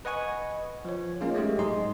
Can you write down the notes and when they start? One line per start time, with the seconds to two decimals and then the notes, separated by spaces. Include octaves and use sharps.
0.05 B4 D#5 F#5 G#5 C#6
0.85 F3 C#5
1.21 G#3 A#3 C#4 D#4 F4
1.34 G#3 A3 G4
1.59 G#2 F#3 D#4 G#4 D#5 C6